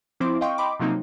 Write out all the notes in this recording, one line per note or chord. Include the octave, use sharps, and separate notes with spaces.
F3 C4 E4 C5 C6 D6
D#5 F5 G5 C6 C#6
D#5 G5 B5 C6 D6
C3 F3 F#3 A#3 C4 D#4